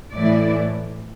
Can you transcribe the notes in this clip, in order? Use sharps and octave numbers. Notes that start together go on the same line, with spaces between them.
A2 E3 A3 E4 D5